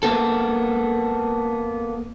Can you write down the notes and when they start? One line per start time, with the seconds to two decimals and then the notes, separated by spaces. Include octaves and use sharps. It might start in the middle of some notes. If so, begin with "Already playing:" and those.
0.03 A#3 B3 A4